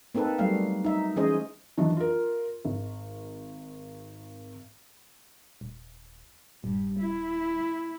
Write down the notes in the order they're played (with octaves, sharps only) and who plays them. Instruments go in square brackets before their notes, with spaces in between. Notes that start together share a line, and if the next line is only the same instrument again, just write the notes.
[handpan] A#3 C4 D#4 A4 B4
F#3 G3 A3 A#3 F5
D#4 E5
E3 G#3 C#4 G#4 C5 D#5
[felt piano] D#3 E3 F#3 D4
F4 A#4
G#1
[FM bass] D#1
[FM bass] D#1 [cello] G2
[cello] E4